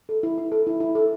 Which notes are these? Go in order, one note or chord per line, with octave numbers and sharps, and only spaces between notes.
A4
E4
E4
A4
E4
E4
A4